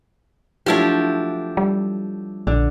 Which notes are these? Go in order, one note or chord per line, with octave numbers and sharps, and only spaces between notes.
F3 F#3 A3 D4 E4 G4
G3
A#1 D3